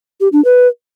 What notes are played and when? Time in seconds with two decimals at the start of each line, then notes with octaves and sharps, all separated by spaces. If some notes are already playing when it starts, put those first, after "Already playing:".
0.21 G4
0.33 D4
0.45 B4